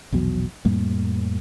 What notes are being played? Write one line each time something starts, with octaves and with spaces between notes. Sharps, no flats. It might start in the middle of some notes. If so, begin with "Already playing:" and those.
A#1 E2 B2 F#3
F2 A2 G3 A#3